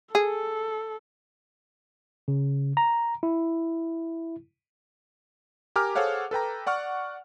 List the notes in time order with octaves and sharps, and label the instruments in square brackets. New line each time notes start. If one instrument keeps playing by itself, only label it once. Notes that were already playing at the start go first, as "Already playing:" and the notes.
[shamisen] G#4 [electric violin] A4
[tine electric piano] C#3
A#5
E4
[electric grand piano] G4 A#4 G#5 A#5 D6 F6
G#4 A4 C5 C#5 F5 F#5
A4 B4 G5 A#5
D5 F#5 C#6 F6